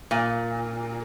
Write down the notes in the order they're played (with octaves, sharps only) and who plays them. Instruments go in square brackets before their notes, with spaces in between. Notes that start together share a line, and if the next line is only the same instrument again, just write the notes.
[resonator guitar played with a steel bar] A#2